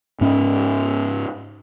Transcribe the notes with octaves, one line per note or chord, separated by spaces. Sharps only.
G#2 C#4